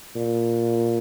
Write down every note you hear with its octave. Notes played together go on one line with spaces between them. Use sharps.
A#2